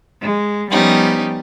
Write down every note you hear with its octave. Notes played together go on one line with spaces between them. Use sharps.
G#3
F3 G3 B3 C#4 D#4 G4